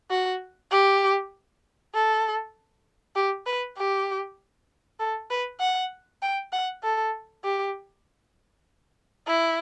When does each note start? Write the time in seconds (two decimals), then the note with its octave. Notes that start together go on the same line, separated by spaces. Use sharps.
0.10 F#4
0.71 G4
1.94 A4
3.16 G4
3.47 B4
3.78 G4
5.00 A4
5.30 B4
5.60 F#5
6.22 G5
6.52 F#5
6.83 A4
7.44 G4
9.28 E4